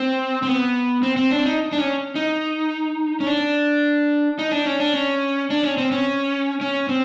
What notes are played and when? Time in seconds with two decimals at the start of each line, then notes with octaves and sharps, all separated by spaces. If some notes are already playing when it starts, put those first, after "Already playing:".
Already playing: C4
0.42 C4
0.47 B3
1.03 C4
1.17 C4
1.31 D4
1.46 D#4
1.72 D4
1.78 C#4
2.15 D#4
3.20 C#4
3.27 D4
4.39 D#4
4.52 D4
4.66 C#4
4.80 D4
4.94 C#4
5.50 D4
5.63 C#4
5.78 C4
5.92 C#4
6.61 C#4
6.89 C4